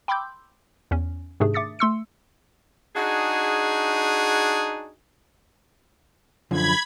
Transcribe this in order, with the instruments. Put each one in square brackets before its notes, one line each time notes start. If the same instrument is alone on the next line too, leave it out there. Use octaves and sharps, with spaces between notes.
[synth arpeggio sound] G5 B5 C6 D6 E6 G6
E2 C#4
G#2 C3 D#3 A3 D4 G#4
E5 D6 D#6 A6 C#7
A3 C6 E6 C#7
[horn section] D4 D#4 F#4 G#4
[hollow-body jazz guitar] F#2 D3 F3 [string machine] B5 G#6